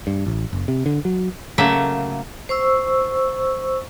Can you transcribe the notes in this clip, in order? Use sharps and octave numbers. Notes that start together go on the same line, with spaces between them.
G2
A1
F#1
C3
D3
F#3
C#3 F#3 A3 A#3 E5
C5 C#6 E6